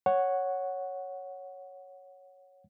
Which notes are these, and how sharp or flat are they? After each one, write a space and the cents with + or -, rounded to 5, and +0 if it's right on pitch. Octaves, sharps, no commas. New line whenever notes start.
C#5 +0 F#5 +0